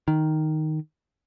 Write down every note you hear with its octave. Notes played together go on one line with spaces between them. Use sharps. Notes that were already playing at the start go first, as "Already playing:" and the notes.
D#3